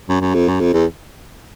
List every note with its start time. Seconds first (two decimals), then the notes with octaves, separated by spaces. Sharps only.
0.09 F#2
0.21 F#2
0.34 F2
0.48 F#2
0.60 F2
0.73 E2